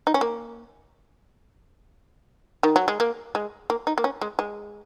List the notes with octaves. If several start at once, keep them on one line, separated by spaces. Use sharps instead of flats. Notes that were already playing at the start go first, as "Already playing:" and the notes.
D#4
C#4
A#3
D#3
F#3
G#3
A#3
G#3
A#3
D#4
A#3
C#4
G#3
G#3